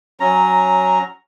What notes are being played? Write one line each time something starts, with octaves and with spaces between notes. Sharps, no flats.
F#3 C#4 A#5